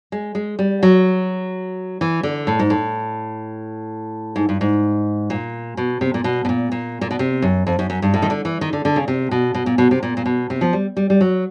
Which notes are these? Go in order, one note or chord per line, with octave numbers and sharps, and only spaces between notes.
G#3
G#3
G3
F#3
E3
D3
A2
G#2
A2
G#2
G2
G#2
A#2
B2
C3
A#2
B2
B2
A#2
A#2
A#2
B2
C3
F#2
F2
F#2
F#2
G2
A2
D#3
D3
E3
D#3
D3
D3
C#3
C3
B2
B2
A#2
B2
C3
A#2
A#2
B2
C3
F3
G3
G3
G3
F#3